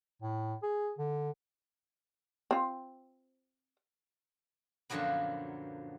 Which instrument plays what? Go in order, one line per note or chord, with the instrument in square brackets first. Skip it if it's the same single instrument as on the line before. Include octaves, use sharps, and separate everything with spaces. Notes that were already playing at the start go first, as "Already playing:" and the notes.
[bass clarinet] A2
G#4
D3
[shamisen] C4 F4
[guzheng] F#2 A#2 D3 F3 F#3 B3